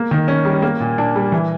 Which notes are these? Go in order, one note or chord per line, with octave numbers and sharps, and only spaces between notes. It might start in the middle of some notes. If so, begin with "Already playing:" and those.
Already playing: A#3
D#3
C#4
G3
A#3
A#2
D4
G3
E3